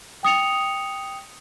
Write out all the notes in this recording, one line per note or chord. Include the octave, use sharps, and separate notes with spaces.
G5 D#6 C#7 F7